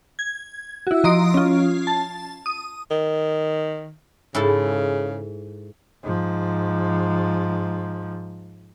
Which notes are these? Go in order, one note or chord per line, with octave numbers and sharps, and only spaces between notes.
G#6
E4 F#4
F3 D#5 A#5 C6 D#6 D7
C#4 F4
A5
D#6
D#3
G#2 C#3 E4 A4
G#2 F3